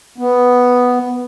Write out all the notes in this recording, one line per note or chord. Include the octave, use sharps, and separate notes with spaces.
B3